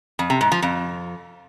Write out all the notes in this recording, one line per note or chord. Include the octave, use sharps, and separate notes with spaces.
F2
C3
G#2
F3
F2